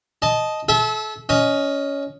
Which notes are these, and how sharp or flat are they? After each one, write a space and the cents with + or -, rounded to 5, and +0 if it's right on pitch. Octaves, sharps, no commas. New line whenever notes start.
D#5 +0 A5 -20
A4 -35 E5 -15
C#4 +15 D#5 +0